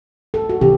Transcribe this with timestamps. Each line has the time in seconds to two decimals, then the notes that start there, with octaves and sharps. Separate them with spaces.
0.34 A4
0.49 F#4
0.61 C3 E3 G4